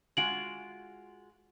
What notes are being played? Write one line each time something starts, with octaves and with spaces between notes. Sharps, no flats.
G#3 F4 F#4 D7 F#7